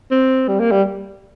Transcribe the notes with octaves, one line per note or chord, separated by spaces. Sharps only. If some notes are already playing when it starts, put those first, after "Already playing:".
C4
G3
A#3
G3